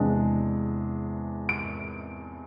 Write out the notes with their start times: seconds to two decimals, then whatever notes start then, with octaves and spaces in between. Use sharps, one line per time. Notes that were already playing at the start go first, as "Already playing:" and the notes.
Already playing: E2 C3 G#3 D4
1.49 D7